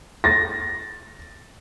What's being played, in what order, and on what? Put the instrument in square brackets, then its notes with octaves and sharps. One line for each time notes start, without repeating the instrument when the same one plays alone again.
[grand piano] A6 A#6